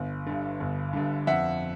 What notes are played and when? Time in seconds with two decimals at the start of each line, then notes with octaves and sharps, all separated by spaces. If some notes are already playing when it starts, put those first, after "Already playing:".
Already playing: G1
0.26 G2 D3
0.60 G1
0.93 G2 D3
1.27 F2 E5 F#5